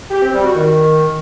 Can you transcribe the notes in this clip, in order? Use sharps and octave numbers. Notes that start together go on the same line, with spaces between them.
G4
C4
G3
F#4
D#3